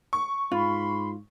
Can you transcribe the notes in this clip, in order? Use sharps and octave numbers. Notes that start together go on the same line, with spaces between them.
C#6
G#2 F4 B5 C6